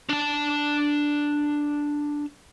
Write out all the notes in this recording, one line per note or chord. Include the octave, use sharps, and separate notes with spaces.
D4 A5